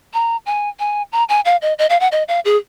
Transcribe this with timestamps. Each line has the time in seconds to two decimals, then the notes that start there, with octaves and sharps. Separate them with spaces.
0.13 A#5
0.46 G#5
0.79 G#5
1.12 A#5
1.29 G#5
1.45 F5
1.62 D#5
1.78 D#5
1.89 F5
2.00 F#5
2.12 D#5
2.28 F5
2.45 G#4